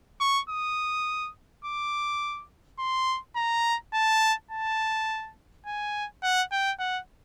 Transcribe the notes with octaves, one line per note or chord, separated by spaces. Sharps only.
C#6
D#6
D6
C6
A#5
A5
A5
G#5
F#5
G5
F#5